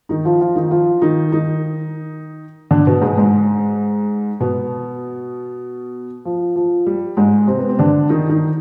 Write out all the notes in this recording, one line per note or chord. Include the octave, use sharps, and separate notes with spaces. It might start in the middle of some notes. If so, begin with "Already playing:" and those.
D#3 D#4
F3 F4
F3 F4
D#3 D#4
F3 F4
D#3 D#4
D#3 D#4
D3 D4
B2 B3
G#2 G#3
G#2 G#3
B2 B3
F3
F3
G3
G#2 G#3
C3 C4
B3
C4
D3 D4
D#3 D#4
D#3 D#4